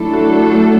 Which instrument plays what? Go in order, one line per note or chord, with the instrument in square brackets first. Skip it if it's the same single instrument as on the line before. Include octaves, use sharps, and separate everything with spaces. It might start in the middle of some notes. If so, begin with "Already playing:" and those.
Already playing: [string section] F#3 A3 D4 A4 [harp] E4
[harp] F#4
F#4